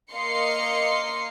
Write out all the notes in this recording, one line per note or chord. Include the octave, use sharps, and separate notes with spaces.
A#3 D#5 F5 C6 C7 C#7